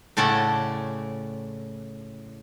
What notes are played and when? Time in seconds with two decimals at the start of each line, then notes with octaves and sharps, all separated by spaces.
0.17 A2 C#3 A3 C#4 D5 F#5